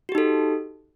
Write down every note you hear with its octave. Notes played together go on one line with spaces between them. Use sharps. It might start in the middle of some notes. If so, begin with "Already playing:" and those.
D#4 F#4 G4 A4